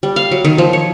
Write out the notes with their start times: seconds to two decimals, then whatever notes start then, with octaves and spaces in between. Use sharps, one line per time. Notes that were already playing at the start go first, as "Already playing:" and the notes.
0.03 G3
0.16 F5
0.31 F#3
0.45 D#3
0.58 F3
0.73 C#5